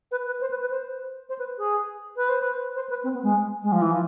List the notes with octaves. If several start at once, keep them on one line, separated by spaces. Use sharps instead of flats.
B4
B4
C5
B4
B4
C5
C5
B4
G#4
B4
C5
B4
C5
B4
C4
B3
G#3
G#3
F3
E3
F3